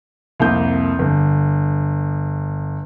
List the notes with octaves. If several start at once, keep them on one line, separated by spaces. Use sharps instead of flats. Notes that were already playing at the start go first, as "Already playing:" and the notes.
C2 F2 A#3 G6
G1